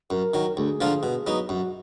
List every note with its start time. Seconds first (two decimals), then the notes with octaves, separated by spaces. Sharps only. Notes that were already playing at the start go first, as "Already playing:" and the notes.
0.10 F#2 A#4
0.34 D#3 F#3
0.57 D2 G#4
0.81 D3 F3 A#3 F4
1.03 B2
1.27 F#3 B3 D#4
1.49 F#2 F#4